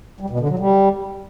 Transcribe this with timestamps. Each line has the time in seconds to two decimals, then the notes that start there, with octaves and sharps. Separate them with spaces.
0.20 G3
0.30 B2
0.40 D3
0.49 F#3
0.59 G3